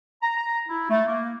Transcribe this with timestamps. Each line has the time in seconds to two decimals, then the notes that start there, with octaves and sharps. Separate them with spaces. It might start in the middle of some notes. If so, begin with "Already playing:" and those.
0.22 A#5
0.37 A#5
0.68 E4
0.90 A3
1.06 A#3